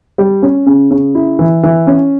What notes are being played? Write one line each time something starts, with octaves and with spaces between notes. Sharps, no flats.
G3
C#4
C#3
C#3
E4
E3
E3
C#4